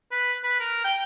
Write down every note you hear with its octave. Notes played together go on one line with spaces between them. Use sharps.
B4
B4
A#4
G5